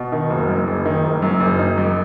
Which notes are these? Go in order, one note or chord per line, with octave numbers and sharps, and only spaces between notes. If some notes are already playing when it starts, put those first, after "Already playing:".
Already playing: B2
D#3
F#1
F#2
F#1
D#3
F#1
F#2
F#1
D#4
F#2